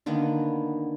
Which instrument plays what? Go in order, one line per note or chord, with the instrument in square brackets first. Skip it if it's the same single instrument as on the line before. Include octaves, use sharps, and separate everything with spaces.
[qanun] D3 D#3 A#3 B3